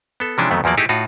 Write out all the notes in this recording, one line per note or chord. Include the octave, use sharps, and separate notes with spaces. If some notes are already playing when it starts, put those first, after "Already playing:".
B3 A4
C3 E3 F3 G#3 C#4 D4
F2 D#3 F#3 A3 B3
E2 F3 F#3 A#3 D5
A3 D#4 E4 G4 G#4
A2 D#4 F4 F#4